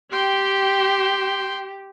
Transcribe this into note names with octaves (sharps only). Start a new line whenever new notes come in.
G4 G5 C6